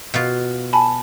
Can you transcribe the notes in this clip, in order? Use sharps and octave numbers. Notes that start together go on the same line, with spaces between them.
B2 F4
G#5 A5 B5